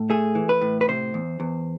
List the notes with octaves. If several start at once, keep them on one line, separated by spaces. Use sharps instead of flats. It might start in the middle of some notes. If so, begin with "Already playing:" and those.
Already playing: A2
A3 G#4
E3
B4
A2
B4
C3 C5
E2
E2